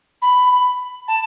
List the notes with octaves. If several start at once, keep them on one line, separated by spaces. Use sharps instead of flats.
B5
A5